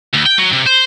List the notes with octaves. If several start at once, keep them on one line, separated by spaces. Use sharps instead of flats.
D2
G5
F#3
C3
C5